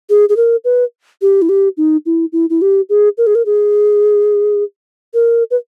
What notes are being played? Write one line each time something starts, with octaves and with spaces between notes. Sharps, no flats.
G#4
G#4
A#4
B4
G4
E4
G4
D#4
E4
E4
E4
G4
G#4
A#4
G#4
A#4
G#4
A#4
B4